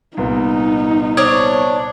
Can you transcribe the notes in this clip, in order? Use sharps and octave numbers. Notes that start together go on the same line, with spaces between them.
C2 A#2 B3 D#4
D4 C5 C#5 D#6 G#6